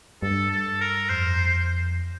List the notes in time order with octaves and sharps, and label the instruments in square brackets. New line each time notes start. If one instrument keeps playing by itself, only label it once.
[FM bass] G2 [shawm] A4
[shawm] A4
A#4
[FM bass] F2 [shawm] C5